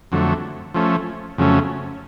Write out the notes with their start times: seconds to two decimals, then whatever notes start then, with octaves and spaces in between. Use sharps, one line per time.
0.12 F2 D3 F#3 A3
0.74 F3 A3 C#4
1.38 F2 C#3 F#3 A3 C#4